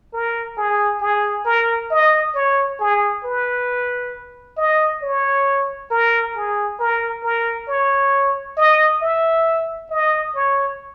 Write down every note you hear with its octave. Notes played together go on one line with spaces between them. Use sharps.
A#4
G#4
G#4
A#4
D#5
C#5
G#4
B4
D#5
C#5
A#4
G#4
A#4
A#4
C#5
D#5
E5
D#5
C#5